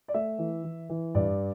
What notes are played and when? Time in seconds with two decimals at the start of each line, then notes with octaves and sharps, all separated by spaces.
0.08 D5
0.14 A3 E5
0.38 E3
0.64 E3
0.89 E3
1.15 G2 D5